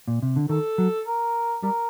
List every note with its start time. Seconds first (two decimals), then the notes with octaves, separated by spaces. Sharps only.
0.08 A#2
0.22 C3
0.36 D3
0.49 D#3 A4
0.78 F#3
1.07 A#4
1.63 G3 A#4